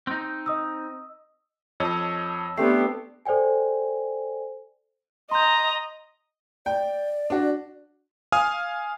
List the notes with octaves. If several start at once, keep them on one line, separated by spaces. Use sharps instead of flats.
C4 D#4
D#5 D#6 E6
F2 C#5 D#5 A5 E6
A3 B3 C4 D4 G4 C7
A4 C5 D5 G5 G#5
D#5 A#5 C6 G6
D5 G5
D4 F#4
F5 G#5 D#6 F6